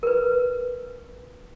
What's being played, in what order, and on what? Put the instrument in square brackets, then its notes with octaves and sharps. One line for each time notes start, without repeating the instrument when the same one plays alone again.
[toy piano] A#4 B4